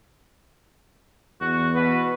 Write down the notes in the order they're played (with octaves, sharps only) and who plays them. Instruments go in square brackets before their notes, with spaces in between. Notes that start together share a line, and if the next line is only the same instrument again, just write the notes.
[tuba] E2 [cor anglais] F#4
[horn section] B2 B3 F#4 [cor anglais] B4